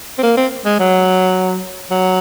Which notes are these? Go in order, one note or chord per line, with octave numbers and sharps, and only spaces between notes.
C4
A#3
C4
G#3
F#3
F#3